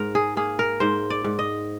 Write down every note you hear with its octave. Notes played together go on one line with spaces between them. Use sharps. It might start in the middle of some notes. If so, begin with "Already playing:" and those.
Already playing: G#2 A#4
G#4
A#3 G#4
A#4
G#2 C5
D5
G#2
D#5